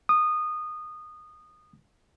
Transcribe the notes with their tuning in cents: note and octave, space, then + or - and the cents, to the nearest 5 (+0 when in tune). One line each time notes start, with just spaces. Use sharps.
D#6 -20